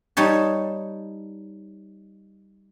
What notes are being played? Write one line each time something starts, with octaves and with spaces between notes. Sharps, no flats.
G3 D#4 C#5 A5